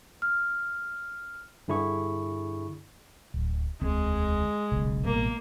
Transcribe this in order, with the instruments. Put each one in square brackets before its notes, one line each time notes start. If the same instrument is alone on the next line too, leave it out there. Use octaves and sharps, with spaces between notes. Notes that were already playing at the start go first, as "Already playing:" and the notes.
[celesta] F6
[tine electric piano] G2 D3 E4 G#4 C#6
[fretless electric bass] D1
[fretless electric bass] E1 D2 C4 [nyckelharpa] G#3
[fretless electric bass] D#1 B1 C#3
[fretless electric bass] A1 B2 G3 [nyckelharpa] A#3